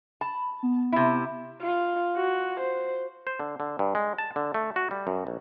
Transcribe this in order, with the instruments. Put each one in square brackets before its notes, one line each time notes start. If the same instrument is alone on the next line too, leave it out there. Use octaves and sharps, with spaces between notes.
[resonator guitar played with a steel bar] A5 [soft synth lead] B5
[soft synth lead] B3
[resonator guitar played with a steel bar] C3 E4
[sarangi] F4
F#4
C5
[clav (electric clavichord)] C5
D3
D3
G2
G#3
A5
D3
A3
F#4
G3
F#2
A#1